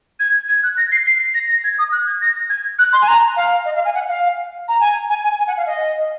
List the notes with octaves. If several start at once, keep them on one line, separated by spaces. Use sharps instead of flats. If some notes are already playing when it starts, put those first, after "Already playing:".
G#6
G#6
F#6
A#6
C7
C7
A#6
A#6
G#6
D#6
F#6
G#6
A#6
G#6
F#6
C6
G#5
A#5
F5
D#5
F5
G#5
F#5
F5
A#5
G#5
G#5
G#5
G#5
F#5
F5
D#5